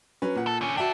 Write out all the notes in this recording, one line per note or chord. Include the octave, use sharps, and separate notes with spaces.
F#3 C#4 B4
A#2 F#5
A4
D3 C#4
D4 F#4 A4 E5 G5